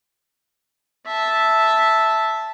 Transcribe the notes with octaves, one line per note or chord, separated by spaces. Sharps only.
E5 A5